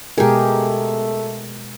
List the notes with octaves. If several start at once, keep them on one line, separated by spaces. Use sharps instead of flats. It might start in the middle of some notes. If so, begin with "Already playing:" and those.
B2 G#3 A3 G4 G#4 A#4